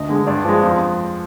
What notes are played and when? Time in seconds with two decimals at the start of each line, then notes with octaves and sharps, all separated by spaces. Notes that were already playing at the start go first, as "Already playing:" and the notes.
Already playing: D2 D#5
0.09 D3 G#3
0.27 G2 D5
0.45 F3 G#3
0.63 F2